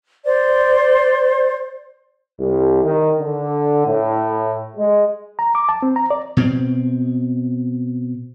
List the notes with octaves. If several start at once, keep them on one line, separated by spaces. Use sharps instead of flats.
C5 D5
C2
D#3
D3
A2
G#3
A#5
D6
A5
C4
A#5
D5
B2 C4